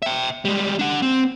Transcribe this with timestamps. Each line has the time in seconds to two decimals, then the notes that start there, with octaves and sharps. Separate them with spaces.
0.02 E5 G5
0.45 G3 G#3
0.79 D4 F#5
1.02 C4